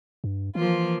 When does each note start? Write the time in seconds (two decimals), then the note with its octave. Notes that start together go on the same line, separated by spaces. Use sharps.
0.24 G2
0.55 E3 F3 A#3 F4